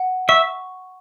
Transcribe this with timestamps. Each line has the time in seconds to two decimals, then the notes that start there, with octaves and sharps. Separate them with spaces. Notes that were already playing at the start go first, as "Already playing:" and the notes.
Already playing: F#5
0.29 E5 C#6